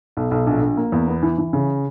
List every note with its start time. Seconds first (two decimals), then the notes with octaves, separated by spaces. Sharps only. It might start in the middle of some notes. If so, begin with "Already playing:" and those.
0.17 B1
0.31 B1
0.47 A#1
0.62 A#1
0.77 A#3
0.92 E2
1.08 B3
1.23 E3
1.38 E3
1.53 C#3